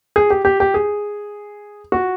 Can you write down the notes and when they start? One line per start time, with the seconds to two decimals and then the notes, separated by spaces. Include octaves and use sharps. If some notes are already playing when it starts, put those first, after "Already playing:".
0.16 G#4
0.30 G4
0.45 G4
0.60 G4
0.74 G#4
1.92 F#4